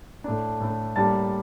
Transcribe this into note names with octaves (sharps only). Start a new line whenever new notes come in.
A2 A3 D4
A2 A3 D4
A2 G3 A#3 D4 A5 A6